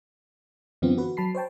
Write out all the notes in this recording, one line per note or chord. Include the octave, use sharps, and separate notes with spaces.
F#2 D3 E3 B3 C4 F4
F#4 B4
F#3 A5 B5 C7
C5 C#5 G5 A5